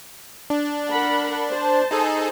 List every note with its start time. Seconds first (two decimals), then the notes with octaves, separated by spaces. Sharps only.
0.50 D4
0.90 A#4 F#5 B5
1.49 C5 A5
1.91 D#4 G#4 A4